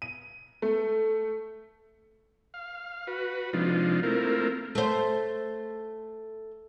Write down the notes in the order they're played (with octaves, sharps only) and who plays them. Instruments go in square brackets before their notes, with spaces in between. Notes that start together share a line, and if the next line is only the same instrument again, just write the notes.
[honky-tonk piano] D#7
A3
[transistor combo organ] F5
F#4 B4
C3 F3 G#3 D4 D#4 F4
A3 A#3 C4 E4 F4 A#4
[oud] A3 C5